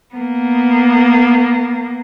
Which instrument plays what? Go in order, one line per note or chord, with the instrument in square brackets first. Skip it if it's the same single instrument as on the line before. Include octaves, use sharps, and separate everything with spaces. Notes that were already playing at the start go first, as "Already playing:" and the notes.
[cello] A#3 B3